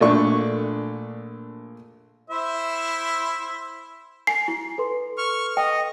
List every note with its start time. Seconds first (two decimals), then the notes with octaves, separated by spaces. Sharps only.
0.01 A#1 A3 D4 C#6
2.30 E4 C5 E5
4.27 G#5 C7
4.48 E4
4.78 A4 B4 C6
5.18 C#6 F6
5.57 D#5 G5